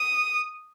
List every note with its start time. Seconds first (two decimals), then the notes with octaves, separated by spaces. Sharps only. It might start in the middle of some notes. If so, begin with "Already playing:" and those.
Already playing: D#6